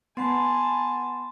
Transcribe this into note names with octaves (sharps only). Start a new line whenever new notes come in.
B3 F#5 G#5 A5 B5 C6 A6